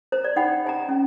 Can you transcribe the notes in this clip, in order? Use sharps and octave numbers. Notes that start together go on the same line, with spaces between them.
C5 A#5
D5
D#4 F#5 G5 B5
D#5 G#5 A#5
C#4